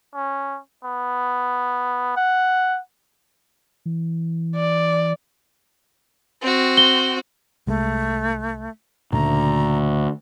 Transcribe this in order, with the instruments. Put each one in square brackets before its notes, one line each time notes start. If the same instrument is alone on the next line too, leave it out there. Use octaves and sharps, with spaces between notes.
[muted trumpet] C#4
B3
F#5
[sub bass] E3
[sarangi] D5
[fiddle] C4 F#4
[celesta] G7
[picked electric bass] C2 G#3 [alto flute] A3
[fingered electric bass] D2 [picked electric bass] A#2 C#3 A3 [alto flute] A#5